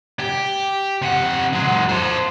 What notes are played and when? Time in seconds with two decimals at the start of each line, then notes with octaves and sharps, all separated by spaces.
0.20 G4
1.02 C3 F#5
1.53 F#3 G#3
1.89 A4 C5